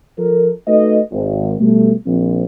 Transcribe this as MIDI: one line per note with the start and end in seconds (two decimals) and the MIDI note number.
0.18 0.50 53
0.18 0.50 69
0.18 0.50 70
0.67 1.00 57
0.67 1.00 63
0.67 1.00 66
0.67 1.00 71
0.67 1.00 75
1.12 1.55 32
1.60 1.93 47
1.60 1.93 55
1.60 1.93 57
2.06 2.45 34
2.06 2.45 53
2.06 2.45 60